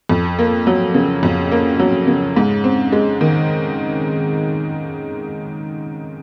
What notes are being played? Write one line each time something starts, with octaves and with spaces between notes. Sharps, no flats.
F2
A#3
F#3
C#3
F2
A#3
F#3
C#3
G#2
C4
G#3
D#3